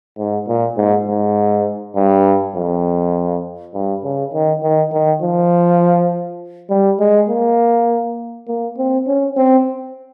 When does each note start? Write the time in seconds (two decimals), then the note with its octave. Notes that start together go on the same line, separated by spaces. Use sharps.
0.18 G#2
0.48 A#2
0.77 G#2
1.08 G#2
1.96 G2
2.55 F2
3.74 G2
4.04 C#3
4.33 D#3
4.63 D#3
4.92 D#3
5.22 F3
6.70 G3
7.00 G#3
7.29 A#3
8.48 A#3
8.78 C4
9.07 C#4
9.37 C4